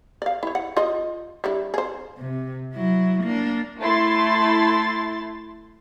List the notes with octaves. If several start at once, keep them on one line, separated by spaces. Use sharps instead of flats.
D5 F5
E4 C#5
F#5
F4 D#5
G3 D4 E4
G#4 C5
C3
F#3 E4
A#3 D4
A3 E4 C6 A6